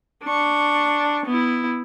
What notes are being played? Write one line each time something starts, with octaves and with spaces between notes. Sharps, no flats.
D4 C#6
B3 E4